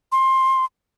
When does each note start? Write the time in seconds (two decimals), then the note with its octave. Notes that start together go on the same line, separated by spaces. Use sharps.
0.12 C6